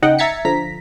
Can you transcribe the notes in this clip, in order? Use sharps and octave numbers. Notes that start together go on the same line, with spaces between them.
C#3 D#4 D#5 F#5 G5
E5 A#5 G#6 A6 B6 C#7
D3 F3 A#5 B6